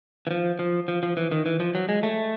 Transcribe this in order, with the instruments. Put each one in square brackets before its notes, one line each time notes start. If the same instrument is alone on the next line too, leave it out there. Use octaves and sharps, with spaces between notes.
[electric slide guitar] E3
F3
F3
F3
F3
E3
D#3
E3
F3
F#3
G#3
A3